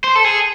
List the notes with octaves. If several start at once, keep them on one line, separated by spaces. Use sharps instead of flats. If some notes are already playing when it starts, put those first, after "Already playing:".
C5
A4
G#4